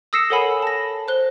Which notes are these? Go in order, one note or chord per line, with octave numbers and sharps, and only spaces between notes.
D#6 E6 A#6 C7 C#7 E7
A4 A#4 C#5 F#5 G#5 B5
A5 A#6
C5 F#6 G7